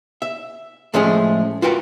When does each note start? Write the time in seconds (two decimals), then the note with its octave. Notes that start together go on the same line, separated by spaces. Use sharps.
0.22 E5
0.94 A2 F3 G#3 A3 C#4 G#4
1.62 F4 F#4 A#4 B4 F#5 G5